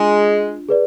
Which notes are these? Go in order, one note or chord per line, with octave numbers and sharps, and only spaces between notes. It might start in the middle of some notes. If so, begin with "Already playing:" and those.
Already playing: G#3 D4 F4
G#4 B4 D5